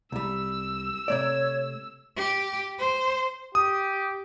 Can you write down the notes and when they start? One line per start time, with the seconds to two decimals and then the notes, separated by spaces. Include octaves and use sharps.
0.12 C2 G3 E6
1.08 C3 A3 C#5 D5
2.17 G4
2.79 C5
3.55 G4 D#6